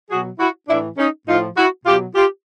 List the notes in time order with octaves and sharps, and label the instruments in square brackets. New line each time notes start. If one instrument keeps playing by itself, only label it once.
[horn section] B2 F#3 F#4 G#4
E4 F#4
A2 E3 D4 E4
C#4 D#4
A2 F3 D#4 F4
E4 F#4
B2 F#3 F4 G4
F4 G4